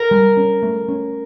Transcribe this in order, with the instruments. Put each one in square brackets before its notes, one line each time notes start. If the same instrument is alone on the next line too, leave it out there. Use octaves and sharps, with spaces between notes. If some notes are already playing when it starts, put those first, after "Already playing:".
Already playing: [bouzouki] A#4
[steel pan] G3
C#4
A3
C#4